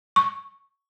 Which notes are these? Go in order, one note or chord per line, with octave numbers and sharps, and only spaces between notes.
C#6